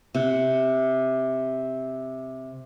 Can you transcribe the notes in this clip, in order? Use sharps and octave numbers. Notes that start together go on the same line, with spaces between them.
C3 F#5